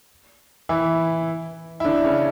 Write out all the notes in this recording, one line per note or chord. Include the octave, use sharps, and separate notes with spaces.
E3 E4
E4
D3 D4
C#3 C#4